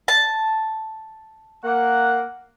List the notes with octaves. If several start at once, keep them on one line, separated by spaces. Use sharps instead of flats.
A5
A#3 F#5